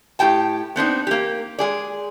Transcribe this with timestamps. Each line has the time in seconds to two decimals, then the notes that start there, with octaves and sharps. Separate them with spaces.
0.19 A2 G4 G5 A5
0.76 B3 C4 D4 D#4
1.07 A#3 G4
1.59 G#3 G#4 D5